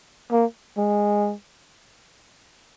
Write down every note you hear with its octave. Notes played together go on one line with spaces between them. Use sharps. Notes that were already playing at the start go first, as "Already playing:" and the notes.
A#3
G#3